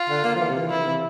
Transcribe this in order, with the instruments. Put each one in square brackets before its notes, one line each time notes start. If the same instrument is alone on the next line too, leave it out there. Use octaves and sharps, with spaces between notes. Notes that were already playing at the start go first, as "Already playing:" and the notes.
Already playing: [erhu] F4
[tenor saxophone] D3
A#3
F3
E3
C3
E3
[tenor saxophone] E3 [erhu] E4
[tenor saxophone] C3